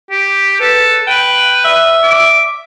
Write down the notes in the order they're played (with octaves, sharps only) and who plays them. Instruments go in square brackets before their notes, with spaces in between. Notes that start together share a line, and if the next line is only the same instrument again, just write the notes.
[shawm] G4
[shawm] A4 [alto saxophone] B4
[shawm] B4 [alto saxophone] G5
[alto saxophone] E5
[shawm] D6